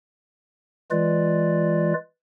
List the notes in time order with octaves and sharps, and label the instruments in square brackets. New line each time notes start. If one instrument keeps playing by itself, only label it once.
[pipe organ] E3 G#3 F4 B4 D5